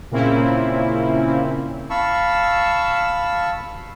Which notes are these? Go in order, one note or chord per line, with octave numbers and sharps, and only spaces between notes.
A#2 C#3 A#3 C4 C#4 E4
F5 A5 B5 C#6 E6